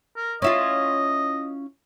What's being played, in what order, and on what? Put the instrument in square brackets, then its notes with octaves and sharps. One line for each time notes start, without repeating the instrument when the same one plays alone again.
[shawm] A#4
[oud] C#4 E4 F4 [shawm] D#5